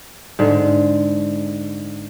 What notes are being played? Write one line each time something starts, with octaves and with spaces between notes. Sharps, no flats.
G#2 D3